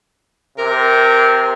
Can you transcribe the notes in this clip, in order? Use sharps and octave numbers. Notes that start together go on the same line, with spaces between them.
C3 A#4